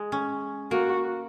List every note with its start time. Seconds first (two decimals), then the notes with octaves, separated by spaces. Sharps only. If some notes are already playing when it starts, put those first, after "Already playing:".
Already playing: G#3
0.12 C#4
0.71 A#3 F#4